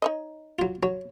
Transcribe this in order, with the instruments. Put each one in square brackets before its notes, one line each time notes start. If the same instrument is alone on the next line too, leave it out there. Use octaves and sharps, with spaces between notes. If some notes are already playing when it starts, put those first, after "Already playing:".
[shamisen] D#4 C#5 D#5
[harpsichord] F#3 F4
[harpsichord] F#3 [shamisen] C#5